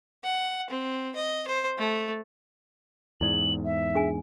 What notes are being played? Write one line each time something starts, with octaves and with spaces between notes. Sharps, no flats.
F#5
C4
D#5
C5
A3
E2 G#2 E4 D5 F#7
E5
D4 G#4 G#5